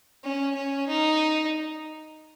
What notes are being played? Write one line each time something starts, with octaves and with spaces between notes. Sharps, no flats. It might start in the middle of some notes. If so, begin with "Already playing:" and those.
C#4
C#4
D#4